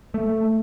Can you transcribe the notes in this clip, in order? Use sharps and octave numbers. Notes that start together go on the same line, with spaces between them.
A3